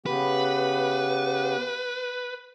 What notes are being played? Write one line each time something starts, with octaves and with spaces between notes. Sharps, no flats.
C#3 B3 G4 B4